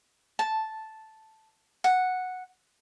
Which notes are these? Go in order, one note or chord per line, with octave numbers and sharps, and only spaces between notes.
A5
F#5